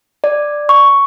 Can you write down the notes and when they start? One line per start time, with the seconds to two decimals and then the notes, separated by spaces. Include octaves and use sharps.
0.24 D5
0.69 C#6